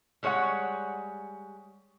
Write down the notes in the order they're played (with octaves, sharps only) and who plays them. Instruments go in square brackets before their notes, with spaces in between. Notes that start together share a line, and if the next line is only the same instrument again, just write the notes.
[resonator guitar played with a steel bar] G3 G#3 C#5 F5 F#5